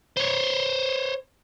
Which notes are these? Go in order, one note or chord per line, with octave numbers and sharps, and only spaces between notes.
C5 C#5